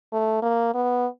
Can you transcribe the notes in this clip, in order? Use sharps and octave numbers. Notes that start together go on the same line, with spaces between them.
A3
A#3
B3